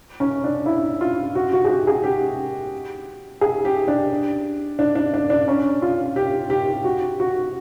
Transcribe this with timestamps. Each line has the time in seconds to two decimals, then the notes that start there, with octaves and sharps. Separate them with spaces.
0.20 C#4
0.44 D4
0.66 E4
1.01 F4
1.35 F#4
1.53 F#4
1.65 G#4
1.69 G4
1.87 G#4
2.03 G4
3.41 G#4
3.65 G4
3.88 D4
4.79 D4
4.95 D4
5.14 D4
5.30 D4
5.48 C#4
5.82 F4
6.16 G4
6.50 G4
6.84 F#4
7.20 F#4